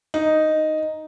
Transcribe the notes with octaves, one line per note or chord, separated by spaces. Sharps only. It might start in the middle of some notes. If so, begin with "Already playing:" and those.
D#4